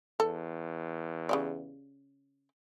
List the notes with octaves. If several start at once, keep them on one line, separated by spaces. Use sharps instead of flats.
E2 A4
C#3 G4 D5